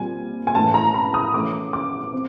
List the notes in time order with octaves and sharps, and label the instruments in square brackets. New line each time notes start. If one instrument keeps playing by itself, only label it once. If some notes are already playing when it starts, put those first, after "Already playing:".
Already playing: [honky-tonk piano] A#2 G3 C4 G#5
G#5
A2 E3 A3 C#4 A5
A#5
B5
D#6
E3 A3 C#4 D6
D6
C4